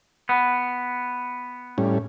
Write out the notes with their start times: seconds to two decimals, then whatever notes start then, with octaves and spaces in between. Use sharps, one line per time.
0.29 B3
1.78 A2 G3 C#4